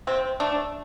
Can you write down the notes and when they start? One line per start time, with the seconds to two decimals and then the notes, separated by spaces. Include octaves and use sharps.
0.07 C3 C4
0.40 A3 D4